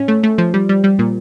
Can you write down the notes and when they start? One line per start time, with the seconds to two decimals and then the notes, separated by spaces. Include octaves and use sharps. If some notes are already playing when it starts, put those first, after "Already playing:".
Already playing: A2 C#4
0.08 A3
0.23 A3
0.38 F3
0.54 G3
0.69 G3
0.84 G3
0.99 A#2